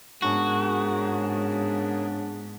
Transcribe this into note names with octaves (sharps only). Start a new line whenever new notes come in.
G#2 C#3 B3 D4 F#4 G#4 A#4